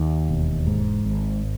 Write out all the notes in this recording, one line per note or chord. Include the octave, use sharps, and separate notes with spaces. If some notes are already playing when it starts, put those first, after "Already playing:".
Already playing: D#2
E1
G#2
G#1